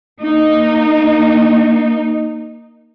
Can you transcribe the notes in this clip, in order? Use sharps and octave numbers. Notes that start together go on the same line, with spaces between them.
A#3 D#4